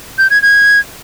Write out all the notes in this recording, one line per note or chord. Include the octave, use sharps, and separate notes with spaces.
G6
G#6
G#6